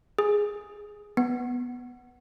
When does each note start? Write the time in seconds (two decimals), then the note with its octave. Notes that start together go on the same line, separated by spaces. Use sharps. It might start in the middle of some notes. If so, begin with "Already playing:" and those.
0.19 G#4
1.17 B3